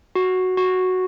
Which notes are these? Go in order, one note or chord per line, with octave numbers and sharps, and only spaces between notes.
F#4
F#4